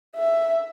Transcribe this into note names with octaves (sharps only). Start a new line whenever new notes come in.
E5